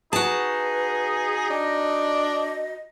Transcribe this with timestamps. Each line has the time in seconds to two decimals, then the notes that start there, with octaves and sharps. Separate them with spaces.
0.13 D#4 F#4 G#4 B4 A5
1.50 D4 D#5